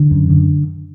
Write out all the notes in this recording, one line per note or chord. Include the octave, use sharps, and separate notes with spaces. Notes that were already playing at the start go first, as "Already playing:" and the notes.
Already playing: D3
F#2
D3